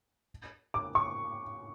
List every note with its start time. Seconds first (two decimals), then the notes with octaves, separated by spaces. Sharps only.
0.74 D6
0.95 C#6